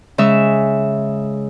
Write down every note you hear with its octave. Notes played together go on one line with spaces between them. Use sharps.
C#3 G#3 E5